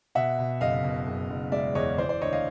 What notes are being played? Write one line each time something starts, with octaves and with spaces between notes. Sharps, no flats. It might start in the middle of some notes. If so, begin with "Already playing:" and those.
B2 E5 F#5
B2
F#1 D#5 F5
B2
F#1
F#1
G#3 D5 E5
E2 C#5 D#5
E3 C5 D5
C5 D5
D2 C#5 D#5
D#5 F5